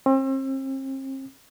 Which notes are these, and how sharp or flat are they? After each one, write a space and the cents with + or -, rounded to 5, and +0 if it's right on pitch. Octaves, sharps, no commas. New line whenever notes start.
C4 +40